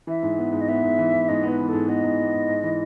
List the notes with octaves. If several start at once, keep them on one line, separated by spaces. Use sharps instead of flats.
E3 E5
G#2
B3
G#2
D#5
B3 E5
G#2
E3
E3
G#2 D#5
B3
B4
E3
G#2 A4
B3 D#5
G#2
B3
G#2
G#2
E3